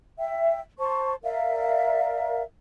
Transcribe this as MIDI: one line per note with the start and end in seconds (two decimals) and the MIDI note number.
0.18 0.59 76
0.18 0.59 79
0.78 1.14 72
0.78 1.14 81
0.78 1.14 85
1.24 2.42 70
1.24 2.42 74
1.24 2.42 76
1.24 2.42 77